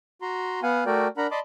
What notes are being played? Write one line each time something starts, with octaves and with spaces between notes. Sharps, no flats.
F#4 A#5 C6
B3 F5 F#5 G#5
A3 F#4 A#4 D5 G5
D4 A#4 F#5 A#5 B5
D5 D#5 A5 B5 C6 D6